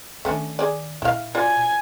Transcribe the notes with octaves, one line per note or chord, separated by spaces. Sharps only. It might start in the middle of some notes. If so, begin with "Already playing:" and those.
D#3 A3 C#4 D4
G#4 D5
A#2 E4 F5
F4 F#4 D5 G#5